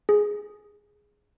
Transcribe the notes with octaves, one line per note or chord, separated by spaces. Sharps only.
G#4